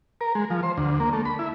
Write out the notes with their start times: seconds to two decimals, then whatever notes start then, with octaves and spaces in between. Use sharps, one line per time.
0.21 A#4
0.35 G#3
0.50 F3
0.63 C5
0.77 D2
1.00 A#3
1.13 A3
1.25 B5
1.39 E4